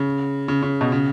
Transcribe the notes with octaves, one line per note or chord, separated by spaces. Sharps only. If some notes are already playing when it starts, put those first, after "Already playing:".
Already playing: C#3
C#3
C#3
B2
C#3